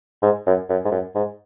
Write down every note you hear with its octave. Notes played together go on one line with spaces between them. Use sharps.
G#2
F#2
F#2
G#2
F#2
G#2